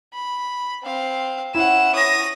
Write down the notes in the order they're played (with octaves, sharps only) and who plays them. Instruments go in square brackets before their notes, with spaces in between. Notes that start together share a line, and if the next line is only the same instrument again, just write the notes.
[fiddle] B5
C4 F5
[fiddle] C#4 F#5 [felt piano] E4 [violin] E7
[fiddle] C#5 [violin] D#6 A#6